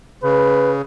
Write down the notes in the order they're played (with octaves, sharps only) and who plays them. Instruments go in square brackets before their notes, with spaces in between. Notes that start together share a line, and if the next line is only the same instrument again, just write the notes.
[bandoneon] C#3 [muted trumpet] B4